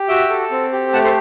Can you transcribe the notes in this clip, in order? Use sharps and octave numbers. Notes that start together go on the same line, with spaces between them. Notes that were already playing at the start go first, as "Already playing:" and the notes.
Already playing: G4
F#4 E5 G5
A4
C4
G4
A3 F#5 A5
A4 C5